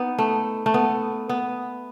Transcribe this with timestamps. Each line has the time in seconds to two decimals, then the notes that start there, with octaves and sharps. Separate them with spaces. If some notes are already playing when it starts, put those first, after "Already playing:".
Already playing: B3 D#4
0.18 A3
0.66 A3
0.74 B3
1.29 B3